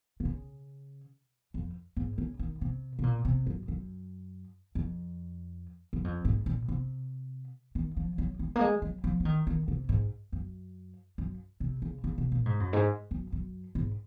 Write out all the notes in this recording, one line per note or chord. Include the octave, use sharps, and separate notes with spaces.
C3
C#3
F2
G#2
C#3
D#3
C3
C3
A#2
C3
F#2
F#2
F2
F#2
F2
G#2
A#2
C3
D#3
F3
F#3
G#3
A#3
G#3
F#3
F3
F3
D#3
D#3
C3
G#2
F#2
F#2
C3
C#3
C#3
C3
A#2
G#2
F#2
G#2
F#2
F#2
G#2